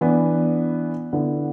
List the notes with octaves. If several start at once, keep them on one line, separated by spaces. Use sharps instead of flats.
E3 B3 D4
D3 B3 E4 A4